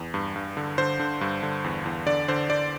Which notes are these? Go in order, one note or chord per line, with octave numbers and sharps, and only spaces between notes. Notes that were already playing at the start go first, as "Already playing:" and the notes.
Already playing: E2
G2
G2
D3
D3 C5
D3
G2
D3
E2
E2
D3 D5
D3 C5
D3 D5